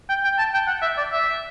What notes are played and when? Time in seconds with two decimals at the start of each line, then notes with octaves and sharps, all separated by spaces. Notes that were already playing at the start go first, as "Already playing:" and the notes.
0.09 G5
0.24 G5
0.38 A5
0.53 G5
0.67 F#5
0.82 E5
0.98 D5
1.12 E5